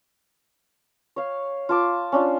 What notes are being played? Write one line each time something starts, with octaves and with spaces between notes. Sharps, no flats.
C#5 F5
F4 A5 D6
C#4 D4 F4